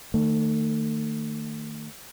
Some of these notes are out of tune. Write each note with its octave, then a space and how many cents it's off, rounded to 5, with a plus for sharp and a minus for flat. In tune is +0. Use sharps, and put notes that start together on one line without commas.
D#3 -20 A3 +30